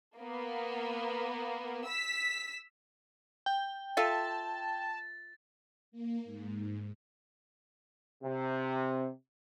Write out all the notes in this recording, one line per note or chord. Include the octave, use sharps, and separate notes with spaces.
A#3 B3
E6 B6
G5
F4 A4 E5 A5 A6
A#3
G#2
C3